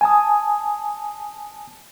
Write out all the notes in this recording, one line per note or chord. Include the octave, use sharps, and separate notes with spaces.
G#5 A5 D#6